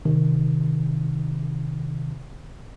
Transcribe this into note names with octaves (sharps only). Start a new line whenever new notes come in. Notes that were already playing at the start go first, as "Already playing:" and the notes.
C3 D#3